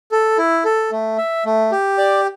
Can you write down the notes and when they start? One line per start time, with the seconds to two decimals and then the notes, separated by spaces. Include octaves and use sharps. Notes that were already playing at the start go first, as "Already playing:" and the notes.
0.12 A4
0.38 E4
0.65 A4
0.91 A3
1.18 E5
1.45 A3
1.72 G4
1.98 D5